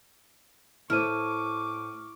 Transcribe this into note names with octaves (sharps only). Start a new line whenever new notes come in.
A2 E4 A4 C5 C#6 D6 F6 D#7